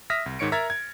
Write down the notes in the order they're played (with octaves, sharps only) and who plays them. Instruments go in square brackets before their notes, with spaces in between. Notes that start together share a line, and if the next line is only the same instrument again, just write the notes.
[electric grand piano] E5 D#6 F6 A#6 B6
C2
G#2 D#3 C#5 C#7 D7
A#4 E5 A#5 F6 G#6 A6
G#6